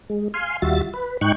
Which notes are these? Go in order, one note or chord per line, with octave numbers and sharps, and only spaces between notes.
G#3
F5 G#5 C6
D#2 G3 F4 F#4 E5 A6
B4
G#2 D#4 G5 C#6 F#6